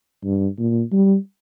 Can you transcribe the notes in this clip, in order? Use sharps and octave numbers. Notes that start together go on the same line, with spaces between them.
G2
A#2
G3